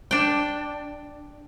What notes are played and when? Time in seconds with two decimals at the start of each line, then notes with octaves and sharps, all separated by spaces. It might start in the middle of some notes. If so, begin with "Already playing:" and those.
0.11 D4 G5